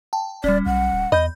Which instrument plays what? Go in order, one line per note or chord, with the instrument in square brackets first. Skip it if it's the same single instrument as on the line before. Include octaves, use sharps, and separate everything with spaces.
[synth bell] G5 A5
[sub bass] D1 [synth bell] G3 C#4 [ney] D5
[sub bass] B1 [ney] F#5
[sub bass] D1
[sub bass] E2 [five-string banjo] D#5 [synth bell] B5 G6